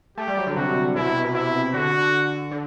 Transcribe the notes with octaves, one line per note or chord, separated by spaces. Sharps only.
A3 G4
G3
F#3
D3
C3 F#4
B2 E4
C3
B2
C3 E4
D3 F#4
D3